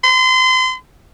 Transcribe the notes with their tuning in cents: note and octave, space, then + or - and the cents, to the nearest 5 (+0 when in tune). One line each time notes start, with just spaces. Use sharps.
C6 -35